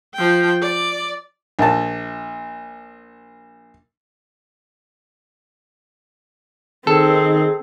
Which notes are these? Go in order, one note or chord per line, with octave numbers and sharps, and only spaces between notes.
F3 G5
D5
A#1 A5
D#3 C4 G#4 A4